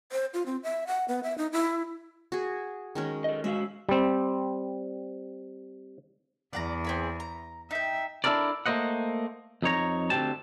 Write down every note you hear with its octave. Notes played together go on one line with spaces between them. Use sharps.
C5
F4
C4
E5
F#5
B3
E5
D#4
E4
F#4 G#4
D#3 G#3 C#4
A4 D#5
G#3 F#4 E5 F5
G3 C4
E2 D5 F#5 A#5
C4 G#4 B5
A#5
D#4 E5 G5
D4 E4 F4 A4 A#4 D5
A3 A#3 C5 D#5 F#5
F2 D#4 C#5 A#5
D2 D#3 C4 G4 A5